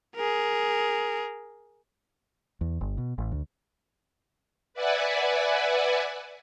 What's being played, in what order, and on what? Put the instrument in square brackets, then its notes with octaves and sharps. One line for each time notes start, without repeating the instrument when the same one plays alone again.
[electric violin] G#4 A#4
[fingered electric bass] E2
G1
B2
A1
D2
[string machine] B4 D5 E5 F#5 G#5